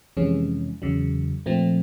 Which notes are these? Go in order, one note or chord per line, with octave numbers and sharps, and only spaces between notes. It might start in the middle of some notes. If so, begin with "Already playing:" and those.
F2 C3 E3 G#3 C#4
E2 C#3 F#3
A#2 F3 A3 C4